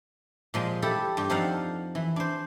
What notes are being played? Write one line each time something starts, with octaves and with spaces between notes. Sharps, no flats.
A#2 F3 G#3
E4 G4 A4
G2 G3 G4
F2 F3 D#4 A4 F5 F#5
E3
D4 C5